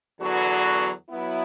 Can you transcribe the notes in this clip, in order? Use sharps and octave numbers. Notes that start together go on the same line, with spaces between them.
E2 D3 F#3 B3 F#4
F#3 B3 E4